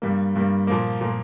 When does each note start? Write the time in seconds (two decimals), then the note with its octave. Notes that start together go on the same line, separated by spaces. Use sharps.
0.02 G2 G3 A#3
0.35 G2 G3 A#3
0.67 A#2 F3 A#3
1.01 A#2 F3 A#3